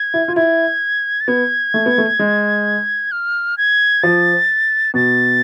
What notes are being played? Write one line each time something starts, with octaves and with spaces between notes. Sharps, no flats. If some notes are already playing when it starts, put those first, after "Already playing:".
Already playing: G#6
E4
F4
E4 G#6
A6
B3 G#6
A3
B3
A3
G#3
F6
G#6
F3 A6
B2 A6